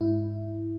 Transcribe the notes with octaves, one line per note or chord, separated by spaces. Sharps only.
G#2 E4